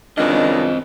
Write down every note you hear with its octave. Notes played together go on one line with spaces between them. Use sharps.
C#2 F#2 D#3 C4 D4 D#5